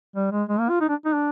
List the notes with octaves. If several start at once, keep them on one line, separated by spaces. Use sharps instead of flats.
G3
G#3
G#3
A#3
F4
D#4
D4
D#4
D4